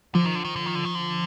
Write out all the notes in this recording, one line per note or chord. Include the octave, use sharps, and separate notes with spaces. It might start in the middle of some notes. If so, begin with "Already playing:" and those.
D3 F3
D#3
D3
D#3
D3
D#3
D3
D#3
D3